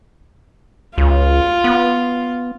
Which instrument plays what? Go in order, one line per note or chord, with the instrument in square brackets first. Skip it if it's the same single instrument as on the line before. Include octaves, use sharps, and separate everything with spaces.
[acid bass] C#2 [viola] F4
[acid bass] B3